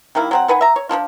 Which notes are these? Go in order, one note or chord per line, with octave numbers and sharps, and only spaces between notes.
D#3 G3 A#3 E4
F#3 C4 F#5
D#3 B4 F#5 G#5
E5 A#5
C#5
F3 A#3 D4 F4